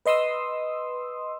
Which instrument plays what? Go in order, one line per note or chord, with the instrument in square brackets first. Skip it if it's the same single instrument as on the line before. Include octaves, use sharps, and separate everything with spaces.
[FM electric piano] B4 D#5 C6 D#6 E6